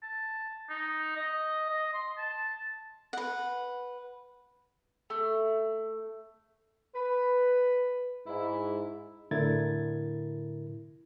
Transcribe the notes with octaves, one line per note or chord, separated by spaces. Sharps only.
A5
D#4
D#5
D#5
C6
A5
B4 F#5
A3
B4
G#2 E4
A2 D3 E4 A#4 G#6 A6